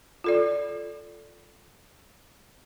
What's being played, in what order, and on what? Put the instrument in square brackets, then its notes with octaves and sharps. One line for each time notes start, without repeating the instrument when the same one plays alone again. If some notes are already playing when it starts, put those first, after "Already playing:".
[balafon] F4 A4 D5